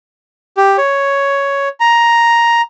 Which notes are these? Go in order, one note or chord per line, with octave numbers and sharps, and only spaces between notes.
G4
C#5
A#5